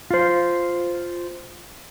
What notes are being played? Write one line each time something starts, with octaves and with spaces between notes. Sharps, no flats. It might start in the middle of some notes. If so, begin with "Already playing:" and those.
F4 C5